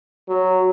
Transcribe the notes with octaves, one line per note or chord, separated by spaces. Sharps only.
F#3